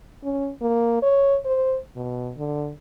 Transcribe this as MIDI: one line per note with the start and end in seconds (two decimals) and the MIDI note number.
0.24 0.51 61
0.61 0.98 58
1.03 1.38 73
1.45 1.77 72
1.96 2.32 47
2.37 2.72 50